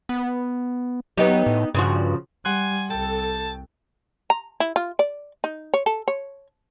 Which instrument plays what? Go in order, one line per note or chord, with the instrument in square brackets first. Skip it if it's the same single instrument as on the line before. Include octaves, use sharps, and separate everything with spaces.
[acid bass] B3
[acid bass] F#3 [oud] B3 D#4 G4
[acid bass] A2
[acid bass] G2 [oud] C#3 F3 F#4
[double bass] G3 [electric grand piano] F#5 C6 F#6 [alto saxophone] G#5
[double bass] C2 [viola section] A4 [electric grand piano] G5 [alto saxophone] A5
[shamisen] A#5
E4
F4
D5
D#4
C#5
A4
C#5